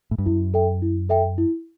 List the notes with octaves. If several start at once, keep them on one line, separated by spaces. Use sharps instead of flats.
A2
G2
F#2 E4
A4 E5 G5
E4
A4 E5 G5
E4